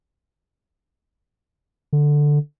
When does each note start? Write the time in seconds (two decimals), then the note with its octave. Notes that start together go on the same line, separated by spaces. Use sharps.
1.93 D3